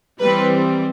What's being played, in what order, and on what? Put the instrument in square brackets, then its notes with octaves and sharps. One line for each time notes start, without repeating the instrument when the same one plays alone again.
[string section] E3 G3 C4 B4